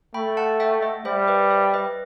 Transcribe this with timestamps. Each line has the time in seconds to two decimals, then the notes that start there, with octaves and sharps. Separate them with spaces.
0.14 A3 G5 B5
0.37 F#5 A5
0.60 E5 G5
0.82 D#5 F#5
1.05 G3 C5 E5
1.27 B4 D#5
1.50 C5 E5
1.74 B4 D#5